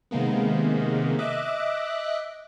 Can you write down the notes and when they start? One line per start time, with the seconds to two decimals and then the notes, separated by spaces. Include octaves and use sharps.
0.11 C3 D#3 G#3 A#3 B3
1.19 D#5 E5 D6 F#6